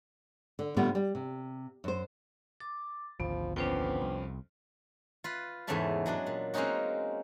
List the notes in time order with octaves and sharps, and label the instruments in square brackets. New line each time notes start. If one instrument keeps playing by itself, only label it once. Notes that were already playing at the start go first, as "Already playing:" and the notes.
[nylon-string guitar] D3
A2 D3 G3 A#3 B3 F4
G3
C3
F#2 C5
[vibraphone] D6 [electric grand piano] A6
[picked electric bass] G#1 D2 [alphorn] F3 [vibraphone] B3
[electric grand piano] F2 F3 C#4 [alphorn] B3 [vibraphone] D4 C5 G5
[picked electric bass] C2
[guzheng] F4 B4
E2 G#2 C#3 A3 E5 A5
F#3 G#3 D4
A#2
G#3 A#3 C4 C#4 D#4 F#4